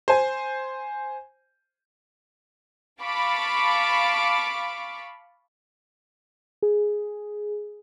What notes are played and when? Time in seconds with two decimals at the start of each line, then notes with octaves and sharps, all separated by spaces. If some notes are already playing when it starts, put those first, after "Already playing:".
0.08 C5 G#5
3.02 F5 A5 B5 C#6 D6
6.62 G#4